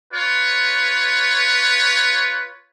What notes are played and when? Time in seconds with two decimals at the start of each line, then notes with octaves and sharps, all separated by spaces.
0.13 F4 B4 C#5